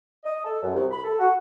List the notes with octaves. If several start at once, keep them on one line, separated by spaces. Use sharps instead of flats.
D#5
A4
F#2
C2
B5
A4
F#4